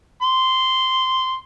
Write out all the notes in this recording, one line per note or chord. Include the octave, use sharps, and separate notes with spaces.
C6